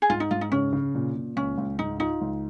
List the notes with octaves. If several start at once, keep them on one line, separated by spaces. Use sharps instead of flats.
G#4
G#2 F4
D#4
G#2 F4
D#4
C#3 C#4
C#3
A#2
A#2
C#2 C#4
C#2
G#2 D#4
D#4 F4
C#2